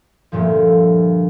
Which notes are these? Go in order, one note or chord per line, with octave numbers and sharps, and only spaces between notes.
D2 G2 A#2 F3